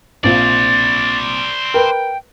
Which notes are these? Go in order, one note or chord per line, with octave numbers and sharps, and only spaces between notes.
A#1 C4 F4 C5 D5 A6
A#4 B4 G5